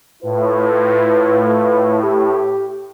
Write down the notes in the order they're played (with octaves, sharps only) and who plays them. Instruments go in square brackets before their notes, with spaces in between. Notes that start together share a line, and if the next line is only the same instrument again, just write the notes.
[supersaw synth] A2 [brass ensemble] E4 F4 B4
[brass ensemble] G4